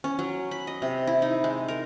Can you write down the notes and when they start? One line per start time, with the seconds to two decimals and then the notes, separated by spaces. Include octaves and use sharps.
0.04 C#4
0.19 F#3
0.51 B5
0.67 D#5
0.82 C3
1.07 E4
1.22 D#4
1.44 G#3
1.68 A#4